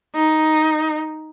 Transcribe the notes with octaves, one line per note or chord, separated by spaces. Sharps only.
D#4